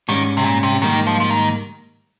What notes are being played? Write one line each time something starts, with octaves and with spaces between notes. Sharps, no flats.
G#2 D#3 G3 C#4
C3
A#2
C3
G#2 D#3 G3 A#3 D#4
F3
F3
D#3